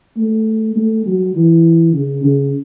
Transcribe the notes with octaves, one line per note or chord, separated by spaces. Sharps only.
A3
A3
F#3
E3
C#3
C#3